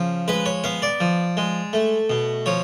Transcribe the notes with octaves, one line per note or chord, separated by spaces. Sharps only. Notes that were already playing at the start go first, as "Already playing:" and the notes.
Already playing: C#3 F3
G#3 B4
C#5
B3 F5
D5
F3
G#3
A3
B2
F3 C#5